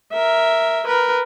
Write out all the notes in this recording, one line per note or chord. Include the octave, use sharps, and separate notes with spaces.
A#4 E5
A#4 B4